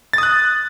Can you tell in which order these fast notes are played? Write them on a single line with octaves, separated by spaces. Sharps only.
A6 D#6 F#6